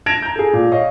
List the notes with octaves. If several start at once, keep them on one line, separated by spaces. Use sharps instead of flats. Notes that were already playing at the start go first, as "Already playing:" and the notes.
A5 G#6 A#6 D7 E7 F7
A#5 G6
G#4 A4
A#2
C#5 D#5 F5